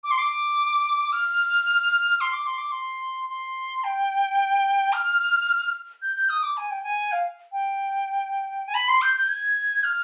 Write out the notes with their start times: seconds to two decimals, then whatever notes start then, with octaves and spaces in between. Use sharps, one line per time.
0.04 D6
0.11 C6
0.18 D6
1.12 F6
2.21 C6
2.33 D6
2.47 C6
2.58 D6
2.71 C6
3.30 C6
3.84 G5
4.93 F6
6.02 G6
6.15 G6
6.29 D#6
6.43 D6
6.57 G#5
6.71 G5
6.84 G#5
7.12 F5
7.52 G5
8.68 G#5
8.74 B5
8.88 C6
9.02 G6
9.16 G6
9.29 G#6
9.84 F6